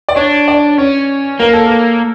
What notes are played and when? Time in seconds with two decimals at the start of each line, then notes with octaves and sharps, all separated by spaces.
0.09 D5
0.16 D4 C#5
0.48 D5
0.78 C#4 C#5
1.40 A#3 A#4
1.53 A4
1.66 A#4